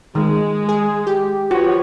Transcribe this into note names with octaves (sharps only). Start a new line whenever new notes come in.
D#3 G#3
G#4
G4
F3 F#4 B4 C#5